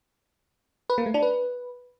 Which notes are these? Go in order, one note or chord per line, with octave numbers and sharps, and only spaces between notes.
B4
A#3
A3
D4
B4